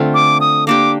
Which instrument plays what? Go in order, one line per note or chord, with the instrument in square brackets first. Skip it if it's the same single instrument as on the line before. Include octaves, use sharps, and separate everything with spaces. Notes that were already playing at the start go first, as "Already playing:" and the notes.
Already playing: [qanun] D3 A3 C4 F4
[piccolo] D6
D#6
[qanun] A#3 D4 G4 [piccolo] D6